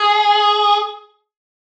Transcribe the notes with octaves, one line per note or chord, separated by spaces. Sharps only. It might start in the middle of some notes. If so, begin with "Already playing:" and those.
Already playing: G#4